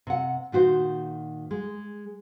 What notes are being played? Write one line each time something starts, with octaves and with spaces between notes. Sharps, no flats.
C3 F#5
A#2 D#3 F#4 C5
G#3